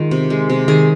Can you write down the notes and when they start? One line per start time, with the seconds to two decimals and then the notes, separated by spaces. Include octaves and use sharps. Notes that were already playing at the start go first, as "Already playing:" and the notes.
Already playing: D#3 G#3 F4
0.11 C3
0.30 G#3
0.49 C3
0.68 D#3 G#4